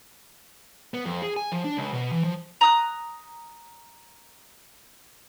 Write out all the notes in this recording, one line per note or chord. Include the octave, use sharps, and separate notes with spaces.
B3
F2
G#4
G#5
F3
D4
C#2
B2
E3
F3
A#5 D#6 F#6